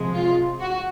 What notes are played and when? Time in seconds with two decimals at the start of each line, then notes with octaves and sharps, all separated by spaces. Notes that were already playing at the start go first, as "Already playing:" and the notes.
Already playing: C3 F3 G#3
0.13 F4
0.60 F#4